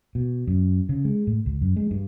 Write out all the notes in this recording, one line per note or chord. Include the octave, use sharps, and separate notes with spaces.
B2
F#2
C#3
G#3
A2
C#2
F#2
G#3
G2